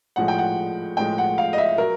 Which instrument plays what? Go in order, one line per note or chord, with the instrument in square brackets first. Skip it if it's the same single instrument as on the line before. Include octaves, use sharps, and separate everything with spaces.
[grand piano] A2 F3 G#3 F#5
G5
F#5
A2 F3 G#3 G5
F#5
F5
D#5
E5
F#3 A#4